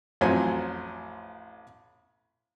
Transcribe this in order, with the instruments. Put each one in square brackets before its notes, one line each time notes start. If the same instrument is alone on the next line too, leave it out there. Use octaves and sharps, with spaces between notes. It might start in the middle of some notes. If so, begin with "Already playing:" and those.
[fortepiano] A1 F2 F#3 C5 G#5